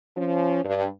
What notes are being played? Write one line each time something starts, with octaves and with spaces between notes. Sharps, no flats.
F3 C#4
G2